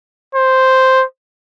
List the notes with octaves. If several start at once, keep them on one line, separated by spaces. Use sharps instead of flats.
C5